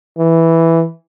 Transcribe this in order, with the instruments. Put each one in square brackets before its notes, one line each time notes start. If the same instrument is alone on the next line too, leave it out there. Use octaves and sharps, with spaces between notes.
[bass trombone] E3